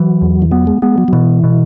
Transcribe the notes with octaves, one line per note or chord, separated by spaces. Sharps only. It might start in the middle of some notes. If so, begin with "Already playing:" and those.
Already playing: E3 F#3
E2
E3
F#3 B3
G#3
G#3 B3
F#3
F#3
B2 E3
B2